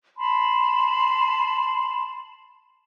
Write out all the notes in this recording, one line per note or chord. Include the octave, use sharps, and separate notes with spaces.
A5 B5 C6